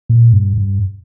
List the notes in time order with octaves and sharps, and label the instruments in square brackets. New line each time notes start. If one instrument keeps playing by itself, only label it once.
[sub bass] A#2
G2
G2